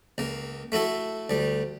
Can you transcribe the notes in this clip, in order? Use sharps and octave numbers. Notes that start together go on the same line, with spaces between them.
C#2 A#3
A3 E4 F#4 A4
D2 G3